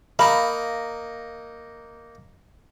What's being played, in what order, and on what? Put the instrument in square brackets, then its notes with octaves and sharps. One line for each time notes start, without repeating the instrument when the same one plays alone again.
[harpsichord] A#3 D#4 [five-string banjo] F5 [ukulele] B5